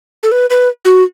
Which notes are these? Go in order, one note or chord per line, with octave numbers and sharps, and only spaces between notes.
A4
B4
B4
F#4